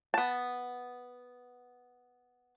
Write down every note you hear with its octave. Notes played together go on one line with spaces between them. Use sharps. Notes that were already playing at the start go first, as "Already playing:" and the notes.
B3 A5